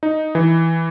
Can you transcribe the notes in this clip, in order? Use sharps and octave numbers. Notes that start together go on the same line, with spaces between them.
D#4
E3